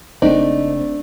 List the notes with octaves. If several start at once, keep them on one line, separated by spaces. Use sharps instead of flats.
F#1 A3 C4 D4 D#4 D5